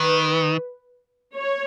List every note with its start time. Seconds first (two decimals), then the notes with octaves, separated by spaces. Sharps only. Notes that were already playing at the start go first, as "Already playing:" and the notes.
Already playing: D#3 B4
1.36 C#5